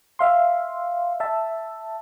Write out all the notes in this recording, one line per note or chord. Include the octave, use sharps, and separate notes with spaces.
E5 F5 C6
E5 A5